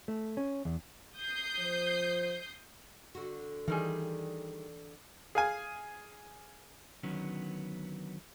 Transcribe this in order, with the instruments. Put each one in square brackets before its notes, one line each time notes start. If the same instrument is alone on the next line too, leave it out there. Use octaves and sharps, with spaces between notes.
[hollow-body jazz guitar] A3
C#4
E2
[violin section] D#6 G6 C7
[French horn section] F3 C5
[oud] D3 F#4
[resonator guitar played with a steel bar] D#3 G3 G#4 [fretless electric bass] E3
[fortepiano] G#4 F5 G#5
[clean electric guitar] D3 D#3 F#3 B3 C#4